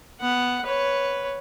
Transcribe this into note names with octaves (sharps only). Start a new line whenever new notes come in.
B3 F#5
B4 C#5